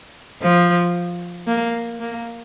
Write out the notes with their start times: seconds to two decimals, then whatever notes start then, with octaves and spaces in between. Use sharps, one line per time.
0.42 F3
1.47 A#3
2.00 A#3